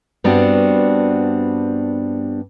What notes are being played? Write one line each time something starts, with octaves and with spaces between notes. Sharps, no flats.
G2 G3 B3 C4 D4 F#4